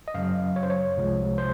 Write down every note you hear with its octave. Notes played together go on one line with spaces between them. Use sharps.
D#5
F#2 C#3 F#3 F5
C#5
C5
C#5
C2 C3 F3 G#3
C5